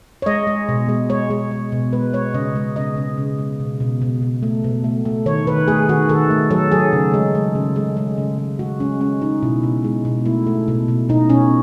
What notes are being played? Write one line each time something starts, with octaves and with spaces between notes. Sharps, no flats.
C#5
G#3 D#5
G#3
B2
G#3
G#3 C#5
G#3
G#3
B2
G#3 B4
G#3 C#5
C#3 D#5
G#3
C#3 D#5
C#3
C#3
G#3
B2
B2
B2
B2
A3
B2
A3
A3
D#3 C#5
D#3 B4
A3 G#4
D#3 F#4
D#3 A4
A3
F#3 A4
F#3 G#4
C#3
G#3
G#3
C#3
G#3
G#3
C#3
G#3
G#3 F#4
G#3 C#4
G#3 C#4
G#3 D#4
B2 E4
B2
G#3
B2
A3 E4
A3
B2
B2
B2 D#4
B2 C#4